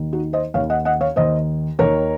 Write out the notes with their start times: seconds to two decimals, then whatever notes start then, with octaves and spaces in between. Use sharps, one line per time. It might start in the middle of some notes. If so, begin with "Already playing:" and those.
Already playing: D#2 D#3
0.13 D#4 F#4
0.33 C5 D#5
0.54 D#2 D#3 C#5 F5
0.70 D#5 F#5
0.85 D#5 F#5
1.01 C#5 F5
1.16 D#2 D#3 C5 D#5
1.79 D#2 D#3 A#4 C#5